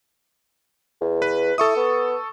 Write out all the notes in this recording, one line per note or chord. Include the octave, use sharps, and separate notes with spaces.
E2
B4
E4 A4 C#6 D#6
B3